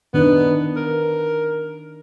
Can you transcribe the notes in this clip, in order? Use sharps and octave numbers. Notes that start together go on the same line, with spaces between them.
D#3 B3 D4 D#4
A#4